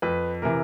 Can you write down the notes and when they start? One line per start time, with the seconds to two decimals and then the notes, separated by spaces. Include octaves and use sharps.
0.02 F2 B4
0.42 C3 E3 A#4